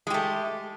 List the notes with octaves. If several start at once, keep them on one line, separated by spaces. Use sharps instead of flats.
G#3 A3 G4